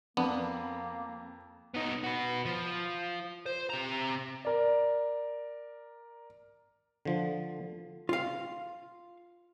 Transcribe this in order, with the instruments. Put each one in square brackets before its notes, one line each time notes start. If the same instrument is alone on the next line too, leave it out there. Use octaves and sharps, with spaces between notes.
[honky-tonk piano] F2 [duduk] A#3 [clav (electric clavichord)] B3 D4
[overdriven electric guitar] B3 D#4
F#4 B4
F3
C5
C3 A#5
[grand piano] A#4 D5
[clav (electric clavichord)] D3 F3
[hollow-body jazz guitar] F4 F5